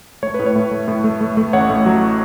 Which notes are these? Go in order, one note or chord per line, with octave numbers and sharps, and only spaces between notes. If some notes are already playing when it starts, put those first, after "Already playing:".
A3 C#5
A2 B4
C#5
A2
A3
A2
A3
A3
A3
A1 C#5 F#5
A2
F#3